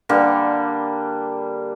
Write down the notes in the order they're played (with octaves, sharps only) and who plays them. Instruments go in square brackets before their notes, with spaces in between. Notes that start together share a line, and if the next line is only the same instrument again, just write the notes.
[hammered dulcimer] D3 G3 A#3